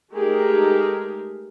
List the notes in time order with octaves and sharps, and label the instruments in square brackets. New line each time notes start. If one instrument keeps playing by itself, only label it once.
[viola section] G#3 A3 D#4 G4 G#4 A#4